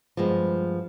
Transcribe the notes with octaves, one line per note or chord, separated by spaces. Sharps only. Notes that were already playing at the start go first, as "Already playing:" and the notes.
G2 F3 G#3 B3